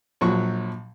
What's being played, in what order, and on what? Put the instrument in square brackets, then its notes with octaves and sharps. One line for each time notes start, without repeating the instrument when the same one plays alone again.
[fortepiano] A#1 F3 F#3 C#6